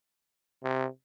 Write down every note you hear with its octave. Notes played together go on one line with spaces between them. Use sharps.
C3